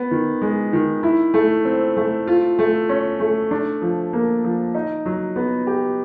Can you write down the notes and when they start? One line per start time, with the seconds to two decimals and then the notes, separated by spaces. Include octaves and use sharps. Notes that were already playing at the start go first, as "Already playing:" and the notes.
Already playing: B3
0.11 D#3
0.41 G#3
0.73 D#3
1.03 E4
1.34 A3
1.65 C4
1.97 A3
2.27 F4
2.59 A3
2.89 C#4
3.20 A3
3.51 D4
3.82 F3
4.13 A#3
4.44 F3
4.74 D#4
5.06 F#3
5.36 B3
5.67 G4